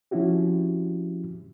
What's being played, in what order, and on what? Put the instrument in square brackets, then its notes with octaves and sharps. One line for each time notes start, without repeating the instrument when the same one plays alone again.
[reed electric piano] F3 C4 C#4 E4 F#4 G4